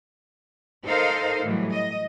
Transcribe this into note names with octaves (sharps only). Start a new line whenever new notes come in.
D#4 A4 A#4 C5 D#5 F5
A2 E3 F#3 G3
D#5